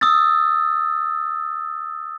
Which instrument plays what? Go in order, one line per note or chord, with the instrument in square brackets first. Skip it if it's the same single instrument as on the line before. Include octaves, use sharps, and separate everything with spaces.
[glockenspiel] D#6 E6 A6